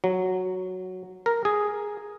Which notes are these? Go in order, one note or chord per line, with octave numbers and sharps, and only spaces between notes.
F#3
A#4
G#4